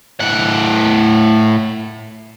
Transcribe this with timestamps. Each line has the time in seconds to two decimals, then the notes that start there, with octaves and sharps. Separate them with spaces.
0.21 A2 F#5